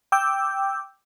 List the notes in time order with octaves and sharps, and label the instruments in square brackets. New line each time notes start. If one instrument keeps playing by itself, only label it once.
[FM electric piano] G5 D6 E6 G6